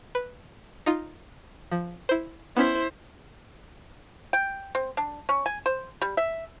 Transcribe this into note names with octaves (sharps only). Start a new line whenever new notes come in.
B4
D#4 F4
F3
E4 C5
B3 C#4 E4 C5 B6
G5
C4
D4
C#4
G#5
C5
G3
E5